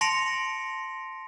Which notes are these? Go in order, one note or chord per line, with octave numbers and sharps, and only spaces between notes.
A5 C6 A#6 C#7 D7 F7